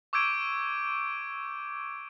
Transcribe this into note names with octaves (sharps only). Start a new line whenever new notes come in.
C#6 D6 E6 G6 G#6 D7